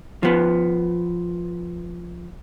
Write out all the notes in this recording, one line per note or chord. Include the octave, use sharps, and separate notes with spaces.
F3 B3